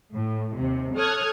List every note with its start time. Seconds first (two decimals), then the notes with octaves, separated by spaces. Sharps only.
0.14 A2
0.56 D#2 C3
0.96 A4 C#5 D#6 F6 F#6 G#6